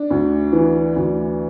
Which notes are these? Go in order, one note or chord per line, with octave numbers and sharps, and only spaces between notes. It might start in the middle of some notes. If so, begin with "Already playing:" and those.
Already playing: D4
D2
E3
D2